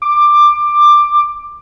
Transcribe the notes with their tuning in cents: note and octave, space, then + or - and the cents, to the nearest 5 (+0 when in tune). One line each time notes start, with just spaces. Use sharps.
D6 +15